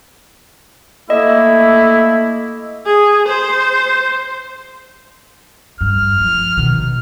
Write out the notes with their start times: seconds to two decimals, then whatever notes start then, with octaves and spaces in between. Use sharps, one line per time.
1.10 A3 A#3 E4 D#5
2.86 G#4
3.28 C5
5.81 G2 F6
6.21 F3
6.57 B2 D#3